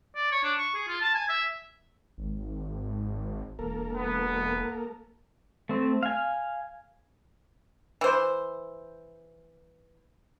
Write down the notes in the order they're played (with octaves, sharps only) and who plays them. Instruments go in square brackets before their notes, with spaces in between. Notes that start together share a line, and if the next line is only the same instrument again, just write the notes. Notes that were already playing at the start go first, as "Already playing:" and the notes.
[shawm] D5
C#5
D4
C#6
G#4
F4
A5
G#5
E5
[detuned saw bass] G#1
[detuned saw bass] E1 [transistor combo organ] A#3 A4 A#4
[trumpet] B3
[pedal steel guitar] A3 C4
F5 G#5
[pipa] E3 C5